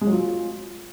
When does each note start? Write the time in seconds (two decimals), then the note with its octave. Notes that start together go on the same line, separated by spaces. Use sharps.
0.01 G#3
0.07 F#3
0.12 F4